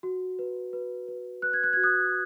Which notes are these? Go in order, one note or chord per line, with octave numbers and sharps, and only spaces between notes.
F#4
B4
B4
B4
B4 F#6
G#6
F#6
F#4 G#6
D#6 F#6